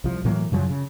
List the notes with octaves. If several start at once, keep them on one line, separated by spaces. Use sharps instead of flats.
C2 F3
A2 E3 F#3 A#3
F#2 C#3 F3 F#3
C#3